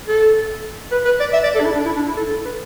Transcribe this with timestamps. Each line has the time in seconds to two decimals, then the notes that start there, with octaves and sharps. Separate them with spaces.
0.08 A4
0.91 B4
1.05 B4
1.20 D5
1.33 E5
1.44 D5
1.55 A4
1.60 D4
1.65 E4
1.75 D4
1.85 E4
1.96 D4
2.07 E4
2.17 A4
2.30 A4
2.45 B4